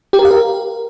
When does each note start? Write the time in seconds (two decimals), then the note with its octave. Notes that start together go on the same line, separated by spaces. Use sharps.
0.13 G4
0.19 A#4
0.25 F5
0.31 A#4